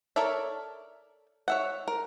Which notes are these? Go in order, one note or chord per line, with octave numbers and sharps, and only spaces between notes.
A4 A#4 C#5 D5 E5
C#5 E5 F#5
A#4